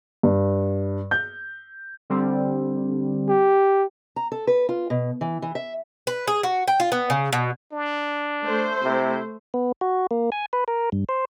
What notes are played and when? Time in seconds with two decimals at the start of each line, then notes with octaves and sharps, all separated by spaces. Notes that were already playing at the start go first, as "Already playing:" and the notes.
0.23 G2
1.11 G6
2.10 D3 G3 C4
3.29 G4
4.16 A#5
4.32 A4
4.47 B4
4.69 F4
4.90 B2
5.21 E3
5.42 E3
5.55 E5
6.07 B4
6.27 G#4
6.43 F#4
6.67 G5
6.80 F4
6.92 B3
7.10 C#3
7.33 B2
7.72 D4
8.44 A3 C5
8.83 C3 E4
9.54 B3
9.81 F#4
10.11 A#3
10.32 G#5
10.53 B4
10.68 A#4
10.92 G2
11.09 C5